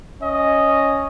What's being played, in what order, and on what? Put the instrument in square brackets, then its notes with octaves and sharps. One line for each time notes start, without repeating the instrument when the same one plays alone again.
[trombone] C#4 [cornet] D#5